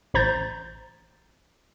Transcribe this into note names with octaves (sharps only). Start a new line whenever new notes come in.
A1 C5 A#5 G6 A6